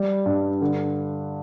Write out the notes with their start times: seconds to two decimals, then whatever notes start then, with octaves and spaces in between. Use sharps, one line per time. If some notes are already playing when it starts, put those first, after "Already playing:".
Already playing: G3
0.26 G2
0.61 D3